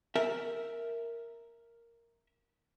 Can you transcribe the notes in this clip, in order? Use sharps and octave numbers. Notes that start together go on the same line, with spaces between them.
A#4 E5